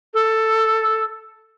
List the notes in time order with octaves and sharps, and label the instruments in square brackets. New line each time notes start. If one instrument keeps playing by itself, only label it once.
[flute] A4